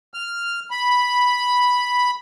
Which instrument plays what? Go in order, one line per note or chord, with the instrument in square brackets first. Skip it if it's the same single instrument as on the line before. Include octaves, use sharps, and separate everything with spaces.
[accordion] F6
B5